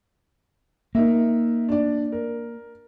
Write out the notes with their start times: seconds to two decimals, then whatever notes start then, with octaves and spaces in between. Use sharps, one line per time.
0.95 A#3 D#4 A#4 E5
1.69 D4 D5
2.12 A#4